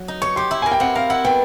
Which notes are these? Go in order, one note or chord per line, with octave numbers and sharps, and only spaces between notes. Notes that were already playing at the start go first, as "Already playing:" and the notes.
Already playing: F#3
D#4
C#5 C#6
G4 C6
E4
A#4 G#5
G5
C4 F#5
A#4 F5
E4 F#5
B3 G5